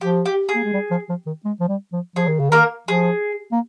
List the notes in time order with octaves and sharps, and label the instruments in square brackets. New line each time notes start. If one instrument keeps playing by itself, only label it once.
[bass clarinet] F3 [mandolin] G4
[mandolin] G4
G#4
[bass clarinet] A#3
G#3
G3
F3
F3
D#3
G#3
F3
G3
F3
[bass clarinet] F3 [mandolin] G#4
[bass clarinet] D#3
C#3
[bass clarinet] D#3 [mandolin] A#3 A#4
[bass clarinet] F3 [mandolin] G#4
[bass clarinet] A#3